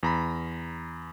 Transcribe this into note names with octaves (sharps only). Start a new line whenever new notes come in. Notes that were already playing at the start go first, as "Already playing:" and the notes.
E2 A#5 B5